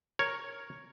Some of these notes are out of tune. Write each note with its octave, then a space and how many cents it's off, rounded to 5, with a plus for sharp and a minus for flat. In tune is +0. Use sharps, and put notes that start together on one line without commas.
A#4 +0 C#5 +0